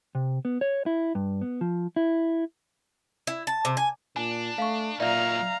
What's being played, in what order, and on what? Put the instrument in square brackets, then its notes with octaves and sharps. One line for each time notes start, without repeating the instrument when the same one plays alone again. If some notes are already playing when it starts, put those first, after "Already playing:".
[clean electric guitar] C3
B3
C#5
E4
G2
B3
F3
E4
[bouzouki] E4
A5
C3
G#5
[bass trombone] A#2 [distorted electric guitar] D4 [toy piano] G#5
[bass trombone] A3 [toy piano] F5 C#6
[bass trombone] A#2 [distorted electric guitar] F#3 D#4 [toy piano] D5 E5 [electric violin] F5 A#5